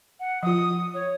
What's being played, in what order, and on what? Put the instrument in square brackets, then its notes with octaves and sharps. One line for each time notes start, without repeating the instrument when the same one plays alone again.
[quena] F#5
[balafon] F3 F4 [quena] D#6
[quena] C#5